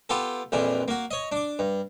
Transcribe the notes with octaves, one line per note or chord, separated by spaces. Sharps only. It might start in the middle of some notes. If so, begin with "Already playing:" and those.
B3 F4 G4 A4
A#1 F2 E3 D4
A#3 F#4
C#5 D#5
D4 D6
G2